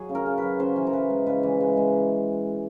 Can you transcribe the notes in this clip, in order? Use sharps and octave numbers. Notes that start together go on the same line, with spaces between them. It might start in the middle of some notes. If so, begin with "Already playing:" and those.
Already playing: F#3 G#4
C#3
A#4
C#3
F#3 B4
C#3 C5
E3
A#4
E3 B4
G#3
C#3 B4
E3
G#3
G#3